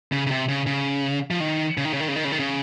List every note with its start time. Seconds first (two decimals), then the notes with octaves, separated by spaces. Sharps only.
0.12 C#3
0.27 C#3
0.31 C3
0.49 C#3
0.66 C#3
1.31 F3
1.40 D#3
1.78 C#3
1.85 D#3
1.93 C#3
2.00 D#3
2.08 C#3
2.16 D#3
2.25 C#3
2.32 D#3
2.39 C#3